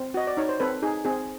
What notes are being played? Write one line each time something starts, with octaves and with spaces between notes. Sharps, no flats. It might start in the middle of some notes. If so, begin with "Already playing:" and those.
Already playing: C4
F#4 D#5
D5
D#4 C#5
C5
C4 A4 B4
D#4 G#4
C4 G#4